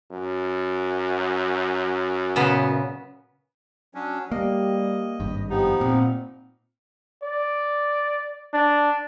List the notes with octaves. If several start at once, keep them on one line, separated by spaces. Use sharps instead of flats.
F#2
A#2 C#3 B3
F#3 C#4 D4
G3 A#3 D#5
G#1 G2
F3 B3 D#4 G4
A#2 C4
D5
D4